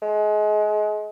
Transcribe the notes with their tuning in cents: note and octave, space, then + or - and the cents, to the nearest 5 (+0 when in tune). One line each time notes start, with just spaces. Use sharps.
G#3 +30